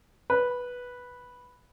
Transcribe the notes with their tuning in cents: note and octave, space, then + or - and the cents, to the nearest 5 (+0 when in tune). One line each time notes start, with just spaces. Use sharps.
B4 -5